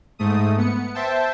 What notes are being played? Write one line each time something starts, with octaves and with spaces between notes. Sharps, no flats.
G#2 A3 D#6
B3 C#7
C5 E5 G5 A5